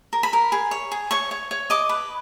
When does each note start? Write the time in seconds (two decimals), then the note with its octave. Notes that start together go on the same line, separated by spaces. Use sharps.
0.13 A#4
0.23 B5
0.33 A#4
0.52 G#4
0.71 C#5
0.92 G#4
1.11 C#5 C#6
1.31 C#5
1.51 C#5
1.70 D#5 D6
1.89 B4